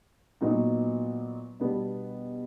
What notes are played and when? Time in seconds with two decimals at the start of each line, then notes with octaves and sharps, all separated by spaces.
0.41 A#2 F#3 B3 D#4 F#4
1.60 B2 G3 B3 D4